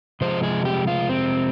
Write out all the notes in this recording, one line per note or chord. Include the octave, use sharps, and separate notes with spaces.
C3 F3 G#3 C5
G#4
G4
F4
C4